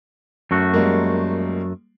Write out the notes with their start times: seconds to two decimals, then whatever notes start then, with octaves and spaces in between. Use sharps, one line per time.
0.51 F#2 A3 F#4
0.74 G3 G#3 A#3